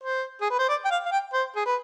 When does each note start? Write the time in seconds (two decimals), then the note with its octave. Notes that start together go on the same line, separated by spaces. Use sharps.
0.04 C5
0.41 G#4
0.51 B4
0.59 C5
0.69 D5
0.85 G5
0.91 F5
1.06 F5
1.12 G5
1.33 C5
1.56 G#4
1.66 B4